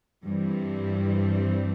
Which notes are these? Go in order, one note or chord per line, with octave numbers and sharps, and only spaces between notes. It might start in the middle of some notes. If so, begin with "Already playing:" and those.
G2 E3 G3 C4